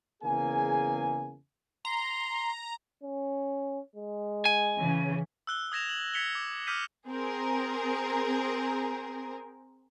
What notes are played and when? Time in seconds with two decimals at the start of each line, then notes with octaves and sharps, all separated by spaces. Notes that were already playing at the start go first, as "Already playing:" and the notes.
0.23 E2 C#3 A#3 G#4 G#5
1.85 A#5 C6
3.03 C#4
3.96 G#3
4.45 G#5
4.78 C#3 E3
5.47 E6 F#6 G7
5.72 D#6 G#6 A#6 E7 F7
5.89 F#7
6.14 G#6 B6 C#7 F7 G7
6.35 D6
6.67 D6 D#6 F6 G6 B6 D#7
7.07 C4 G#4 A#4